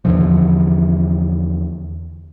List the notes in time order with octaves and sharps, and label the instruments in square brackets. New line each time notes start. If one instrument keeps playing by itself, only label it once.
[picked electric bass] E2 D3 E3 F3